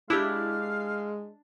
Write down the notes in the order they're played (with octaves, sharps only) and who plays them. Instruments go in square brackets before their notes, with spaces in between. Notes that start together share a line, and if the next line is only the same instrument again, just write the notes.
[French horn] G#3 [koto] D4 [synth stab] E4 G4 [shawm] F5